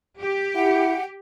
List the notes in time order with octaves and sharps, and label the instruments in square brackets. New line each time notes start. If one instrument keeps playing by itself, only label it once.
[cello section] G4
[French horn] E4 [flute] F#5